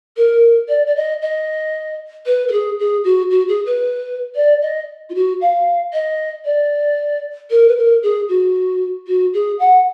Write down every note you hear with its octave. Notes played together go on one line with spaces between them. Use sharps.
A#4
D5
D5
D#5
D#5
B4
A#4
G#4
G#4
F#4
F#4
G#4
B4
D5
D#5
F4
F#4
F5
D#5
D5
A#4
B4
A#4
G#4
F#4
F#4
G#4
F#5